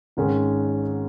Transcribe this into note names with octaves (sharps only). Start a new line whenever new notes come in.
G#1 G#2 D#3 G#3 C#4